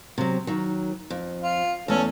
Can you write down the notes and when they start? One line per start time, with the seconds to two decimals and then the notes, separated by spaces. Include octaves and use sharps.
0.18 C3 F#3
0.47 D#3 F#3
1.10 F2
1.43 F4
1.88 E2 A3 C#4 A4